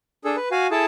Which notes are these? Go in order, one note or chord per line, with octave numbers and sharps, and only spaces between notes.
D4 G#4 A4
B4
F#4 F5 G#5
E4 G#4 A4 A5